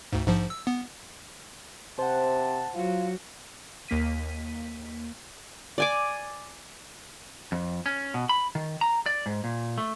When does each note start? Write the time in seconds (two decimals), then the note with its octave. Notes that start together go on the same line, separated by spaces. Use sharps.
0.13 D2 G#2
0.27 A#1 G#2 F3
0.50 E6
0.67 B3
1.99 C3 C5 F#5 A5
2.75 F#3 F4 F#4
3.88 D#2 A#3 B6 D#7
5.78 D5 G#5 D6
7.52 F2
7.86 C#4
8.14 B2
8.29 B5
8.55 D#3
8.81 A#5
9.06 D5
9.26 G#2
9.44 A#2
9.78 A3